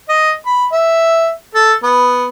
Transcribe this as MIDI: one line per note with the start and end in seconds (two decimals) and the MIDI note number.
0.09 0.31 75
0.46 0.65 83
0.72 1.30 76
1.55 1.73 69
1.83 2.26 59